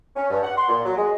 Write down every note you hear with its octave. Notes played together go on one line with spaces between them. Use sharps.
C#4
G2
F#5
C6
A#2
F#3
G#3